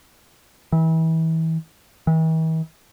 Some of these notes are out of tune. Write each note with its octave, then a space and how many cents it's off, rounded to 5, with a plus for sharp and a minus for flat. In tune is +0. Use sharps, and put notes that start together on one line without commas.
E3 -30
E3 -45